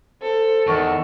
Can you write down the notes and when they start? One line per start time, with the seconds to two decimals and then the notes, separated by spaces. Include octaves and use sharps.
0.21 A4 C5
0.67 E2 D#3 C#6